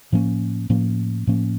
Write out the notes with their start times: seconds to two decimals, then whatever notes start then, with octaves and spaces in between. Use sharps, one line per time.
0.12 A2 F3 A#3 C#4
0.70 A2 F3 A#3 C#4
1.27 A2 F3 A#3 C#4